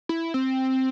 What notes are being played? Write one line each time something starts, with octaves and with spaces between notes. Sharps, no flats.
E4
C4